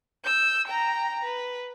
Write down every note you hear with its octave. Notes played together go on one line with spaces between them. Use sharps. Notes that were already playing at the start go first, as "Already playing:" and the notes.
E6 G6
G5 A#5
B4